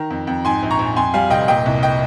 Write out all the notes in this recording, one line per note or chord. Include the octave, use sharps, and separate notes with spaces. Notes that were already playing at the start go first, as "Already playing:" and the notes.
Already playing: D#3 A#5
F2
F2
G#2 G#5 C6
A#1
A#5 C#6
A#1
F2 G#5 C6
G3 F5 G#5
F1 D#5 G5
A#2 D#5 G5
C2
D#5 G5